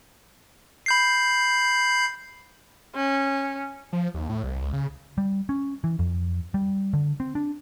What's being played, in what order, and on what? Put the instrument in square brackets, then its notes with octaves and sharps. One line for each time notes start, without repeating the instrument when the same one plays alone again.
[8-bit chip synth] B5 G6 C7
[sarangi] C#4
[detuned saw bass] F3
D#2
A2
C2
C#2
C#3
[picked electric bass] G3
C#4
E3
F2
G3
D3
C4
D4